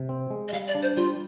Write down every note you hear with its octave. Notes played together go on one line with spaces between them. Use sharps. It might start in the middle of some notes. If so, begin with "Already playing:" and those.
Already playing: C3
C4
G#3
D#5
G3 F5
D5
D4
C5
G3 F4